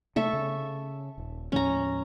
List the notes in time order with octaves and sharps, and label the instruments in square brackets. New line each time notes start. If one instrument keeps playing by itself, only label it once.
[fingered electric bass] C3 A3 [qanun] A4 E5 C#6
[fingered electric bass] C#3
D#1
[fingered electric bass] D#2 A2 F3 [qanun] C#4 A#5